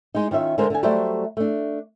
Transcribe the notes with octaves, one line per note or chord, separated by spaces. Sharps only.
G#3 D#4
D#3 C#4 F4 E5
D3 G#3 A#4 C5
D3 G#5
F#3 G3 A3 C5 D5 E5
A3 D4